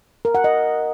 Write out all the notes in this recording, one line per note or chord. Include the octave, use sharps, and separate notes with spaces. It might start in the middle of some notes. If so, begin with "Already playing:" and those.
A#4
F#5
D#5